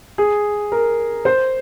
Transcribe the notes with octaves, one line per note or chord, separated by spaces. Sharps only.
G#4
A#4
C5